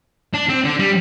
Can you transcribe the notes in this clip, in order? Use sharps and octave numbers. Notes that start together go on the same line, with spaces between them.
D4
C4
D3
G3